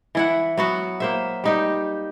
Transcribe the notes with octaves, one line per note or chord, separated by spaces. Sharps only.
E3 E4 F#5
F#3 B3 F#4
A#3 C5 E5
G3 D#4 G4